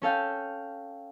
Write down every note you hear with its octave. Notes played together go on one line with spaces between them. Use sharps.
C#4 A4 F5 G5